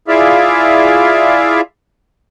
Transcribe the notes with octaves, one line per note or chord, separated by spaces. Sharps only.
E4 F4 G#4 D5 E5 F5